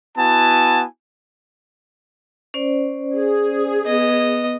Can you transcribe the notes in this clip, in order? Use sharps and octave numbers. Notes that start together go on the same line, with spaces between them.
B3 E4 F#4 G#5 A5
C#4 C5 D5
G#4
B3 D#5